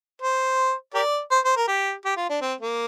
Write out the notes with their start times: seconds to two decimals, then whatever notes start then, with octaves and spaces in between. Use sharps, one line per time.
0.22 C5
0.94 G4 A#4 D5
1.31 C5
1.44 C5
1.57 A#4
1.68 G4
2.05 G4
2.17 F4
2.29 D4
2.41 C4
2.61 A#3